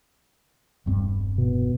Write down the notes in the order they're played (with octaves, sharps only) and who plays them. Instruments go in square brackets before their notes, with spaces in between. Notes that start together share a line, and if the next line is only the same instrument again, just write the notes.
[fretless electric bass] E1 G2 C4
[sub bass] B2